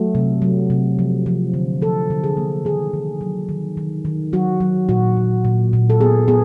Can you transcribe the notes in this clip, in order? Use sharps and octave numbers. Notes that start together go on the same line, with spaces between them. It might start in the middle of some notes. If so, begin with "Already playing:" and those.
Already playing: F#3 A3
C3
F#3
C3
F3
F3
D3
F3 A4
D3
G#4
A#3
D#3 G#4
D#3
F#3
D#3
D#3
D#3
F#3 F#4
F#3
A#2 F#4
A#2
A#2
A#2
A4
B3 G#4
B3 G#4